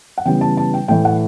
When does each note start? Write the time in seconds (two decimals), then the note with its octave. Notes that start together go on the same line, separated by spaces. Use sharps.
0.18 F#5
0.26 C#3 E3 G3 B3 G5
0.41 A5
0.57 A5
0.74 G5
0.88 A2 E3 A3 G5
1.05 F#5